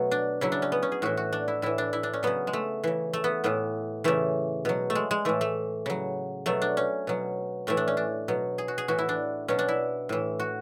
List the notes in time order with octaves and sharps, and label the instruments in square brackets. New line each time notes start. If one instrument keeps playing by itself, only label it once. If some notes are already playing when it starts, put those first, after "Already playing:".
Already playing: [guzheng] B2 F#3 A3 B3
D4
C#3 F#3 E4
D4
C#4
B3
C#4
G#4
A2 E3 F#4
F#4
D4
E4
A2 E3 E4
D4
E4
D4
C#4
C#3 F#3 B3
G#3
A3
C#3 E3
A3
B3
A2 E3 B3
C#3 E3 A3
B2 F#3
A3
G#3
G#3
A2 E3 A3
A3
C#3 F#3
B2 F#3 A3
D4
C#4
B2 F#3
A2 E3 A3
D4
C#4
D4
B2 F#3
G#4
F#4
G#4
A2 E3 F#4
E4
D4
B2 F#3 C#4
D4
E4
A2 E3
F#4